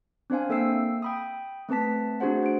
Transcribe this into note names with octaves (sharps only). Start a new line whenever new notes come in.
C4 D4 C5 F5 G#5
A#3 A4 E5 G5 E6 C7
G5 B5 D#6
A3 C4 B4 A5 B6
A3 D4 F#4 G#4 C5 F#5
C5 D7